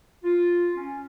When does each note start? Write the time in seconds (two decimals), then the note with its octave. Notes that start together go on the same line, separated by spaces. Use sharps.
0.23 F4
0.75 C#4